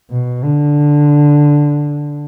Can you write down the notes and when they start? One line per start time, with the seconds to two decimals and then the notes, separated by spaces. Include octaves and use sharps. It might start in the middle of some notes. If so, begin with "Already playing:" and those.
0.11 B2
0.43 D3